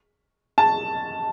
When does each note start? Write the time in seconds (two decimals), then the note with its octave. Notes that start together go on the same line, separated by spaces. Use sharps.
0.58 A5